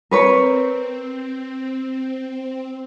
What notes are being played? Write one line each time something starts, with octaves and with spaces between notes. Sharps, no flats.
C4 A#4 B4 C#5